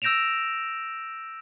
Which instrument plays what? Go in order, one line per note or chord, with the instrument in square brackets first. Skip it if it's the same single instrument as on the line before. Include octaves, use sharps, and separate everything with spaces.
[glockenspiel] E6 G6 A#6 D7 E7 F7